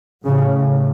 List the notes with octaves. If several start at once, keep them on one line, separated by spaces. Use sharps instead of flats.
A2 C#3